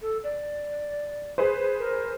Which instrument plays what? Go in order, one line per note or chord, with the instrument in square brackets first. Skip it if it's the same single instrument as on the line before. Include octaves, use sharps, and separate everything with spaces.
[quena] A4
D5
[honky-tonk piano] G#4 B4 C5
[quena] A#4